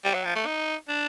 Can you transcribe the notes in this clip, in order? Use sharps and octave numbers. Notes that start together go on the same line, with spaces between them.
G3
F#3
F3
A3
D#4
D4